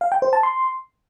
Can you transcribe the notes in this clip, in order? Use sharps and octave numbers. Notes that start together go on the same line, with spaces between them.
F5
G5
C5
A5
C6